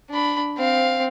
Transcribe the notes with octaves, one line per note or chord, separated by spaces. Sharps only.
D4 B5
C4 F5